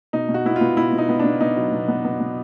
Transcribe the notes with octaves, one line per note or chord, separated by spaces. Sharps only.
B2 D#4
B2
F#4
B3 E4
F4
B3
B2 E4
B2
D#4
B3
D4
B3
B3 D#4
F#3
B2
B3
B3
B2